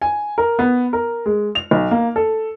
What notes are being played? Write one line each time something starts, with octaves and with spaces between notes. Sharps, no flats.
G#5
A#4
B3
A#4
G#3
F7
B1
A#3
A4